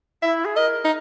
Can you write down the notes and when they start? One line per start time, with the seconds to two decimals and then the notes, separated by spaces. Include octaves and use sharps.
0.22 E4 E5
0.45 G#4
0.56 A#4 D#5
0.85 D#4